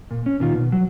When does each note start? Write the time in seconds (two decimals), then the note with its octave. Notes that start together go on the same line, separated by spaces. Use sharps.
0.11 A#2
0.26 C#4
0.40 A#2 D#3 F4
0.55 B2
0.72 F#3